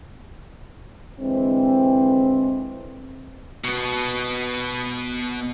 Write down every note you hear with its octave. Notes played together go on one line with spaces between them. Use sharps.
D3 E3 G#3 C4
B2 B3